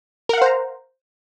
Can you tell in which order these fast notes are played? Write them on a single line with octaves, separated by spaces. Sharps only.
A#4 F#5 F5 C5 A#5